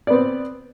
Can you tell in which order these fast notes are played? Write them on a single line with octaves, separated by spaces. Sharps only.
D5 B3 C4